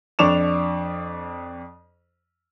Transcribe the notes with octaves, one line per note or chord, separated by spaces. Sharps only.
F2 D4 C#6 D6 E7 F7